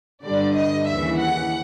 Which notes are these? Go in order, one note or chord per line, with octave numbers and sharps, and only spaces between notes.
G2 D3 G3 D5
D#5
D#2 C#3 E3 E5
F#5